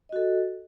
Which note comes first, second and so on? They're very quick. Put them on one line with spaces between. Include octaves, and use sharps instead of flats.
D#5 F#4 A4